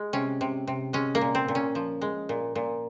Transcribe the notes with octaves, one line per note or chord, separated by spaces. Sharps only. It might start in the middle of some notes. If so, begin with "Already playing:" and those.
Already playing: G#3
C3 C#4
C3
C3
G#3 C#4
A#3
A#2
C4
A#2
C#4
F3
G#3
A#2
A#2